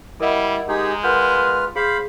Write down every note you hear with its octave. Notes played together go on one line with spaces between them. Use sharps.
G3 E4 A#4 D#5 F#5
G#3 D#4 G4 G#4
F4 A#4 B4 F#5 F6 G6
G#4 C5 F5 B5